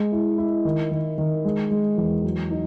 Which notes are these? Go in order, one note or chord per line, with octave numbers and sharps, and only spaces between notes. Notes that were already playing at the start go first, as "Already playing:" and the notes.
Already playing: G#3
E4
E4
D#3
D#3
D#3
G#3
G#3
E2
F#3
D#4